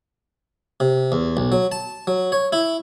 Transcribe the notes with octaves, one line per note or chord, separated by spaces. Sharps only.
C3
E2
B1
F#3
A5
F#3
C#5
E4